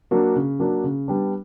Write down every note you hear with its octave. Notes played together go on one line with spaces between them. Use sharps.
F#3 A#3 D4 F#4
C#3
F#3 A#3 D4 F#4
C#3
G3 B3 D4